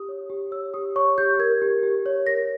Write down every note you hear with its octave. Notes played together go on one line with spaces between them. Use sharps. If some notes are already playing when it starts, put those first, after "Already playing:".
Already playing: G4 D#6
C#5
G4
C#5 E6
G4 D#6
C#5 C#6
G4 G6
A#4 G#6
G4
G4
C#5
A#4 A#6